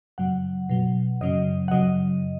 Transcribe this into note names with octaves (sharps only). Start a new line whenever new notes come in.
F#2 C#3 F#3 F#5
B2 F#3
F#2 C#3 F#3 D#5
F#5
F#2 C#3 F#3 D#5